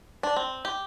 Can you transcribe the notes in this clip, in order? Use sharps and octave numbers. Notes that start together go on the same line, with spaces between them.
D4
C4
G4